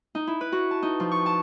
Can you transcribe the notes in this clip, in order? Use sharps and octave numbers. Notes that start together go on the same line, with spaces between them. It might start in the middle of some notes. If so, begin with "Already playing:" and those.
D#4
E4
B4
F#4
A5
D#4
F3
C#6
A5